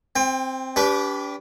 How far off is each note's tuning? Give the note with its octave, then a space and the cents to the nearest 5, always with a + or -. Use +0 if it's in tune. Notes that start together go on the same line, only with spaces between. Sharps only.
C4 +0 G5 +35
D4 -40 G4 +0 B4 +0